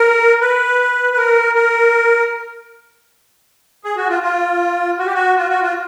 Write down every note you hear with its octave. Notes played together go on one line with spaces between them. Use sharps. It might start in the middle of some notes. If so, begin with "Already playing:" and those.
Already playing: A#4
B4
B4
A#4
A#4
G#4
F#4
F4
F4
F#4
G4
F#4
F4
F#4
F4